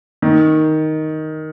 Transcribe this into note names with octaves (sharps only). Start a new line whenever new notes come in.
D#3